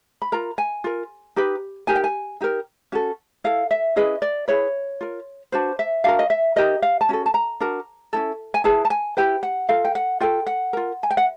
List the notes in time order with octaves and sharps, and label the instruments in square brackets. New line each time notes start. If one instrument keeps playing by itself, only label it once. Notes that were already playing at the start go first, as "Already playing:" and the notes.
[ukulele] B5
F4 A#4 A#5
G#5
F4 A#4
D#4 G4 B4
D#4 G4 A#4 G#5
G5
G#5
D#4 G4 A#4
C#4 F#4 A4
E4 A4 F5
E5
C#4 E4 G#4 B4 D#5
D5
E4 G#4 B4 C#5
F4 A#4
D4 F#4 B4 C5
E5
D4 F#4 A#4 F5
D#5
E5
D#4 G4 A#4 D#5
F5
A5
C#4 F#4 A4
A5
A#5
D4 F#4 A#4
C#4 E4 A4
G#5
E4 G#4 B4 A5
A5
G#5
E4 G4 B4 G5
F#5
F4 A4 F5
G5
F#5
F4 A4 G5
F#5
F4 A#4
G#5
G5
F#5